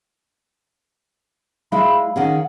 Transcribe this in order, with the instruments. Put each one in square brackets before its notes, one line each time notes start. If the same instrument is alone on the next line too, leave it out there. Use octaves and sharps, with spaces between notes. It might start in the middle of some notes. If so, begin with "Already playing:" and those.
[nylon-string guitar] G#3 E4 [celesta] F5 [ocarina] B5
[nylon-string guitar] D#3 C#4 G#4 [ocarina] F#5